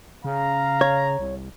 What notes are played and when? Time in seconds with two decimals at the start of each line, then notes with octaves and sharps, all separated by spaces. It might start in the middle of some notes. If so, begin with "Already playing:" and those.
0.24 C#3 F5 A#5
0.81 C#5
1.19 C2